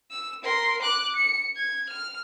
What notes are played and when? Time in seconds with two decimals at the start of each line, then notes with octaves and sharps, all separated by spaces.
0.11 E6
0.43 A#4 C6
0.82 D6 F#6
1.16 C#7
1.56 G#6
1.89 F6